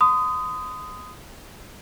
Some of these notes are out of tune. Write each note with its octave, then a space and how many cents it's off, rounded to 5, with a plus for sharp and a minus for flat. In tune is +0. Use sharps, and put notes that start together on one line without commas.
C6 -45 D#6 +0